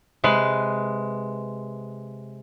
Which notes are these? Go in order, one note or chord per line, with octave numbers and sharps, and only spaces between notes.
C3 G#3 B4